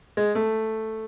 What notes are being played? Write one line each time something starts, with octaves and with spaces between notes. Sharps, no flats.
G#3
A3